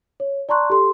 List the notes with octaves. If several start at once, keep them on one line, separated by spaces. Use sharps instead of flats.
C#5
D5 A5 A#5 C6 C#6 F#6
G4 A4 C6